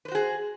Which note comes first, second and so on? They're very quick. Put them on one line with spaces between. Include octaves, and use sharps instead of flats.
B4 C5 F#4 G#4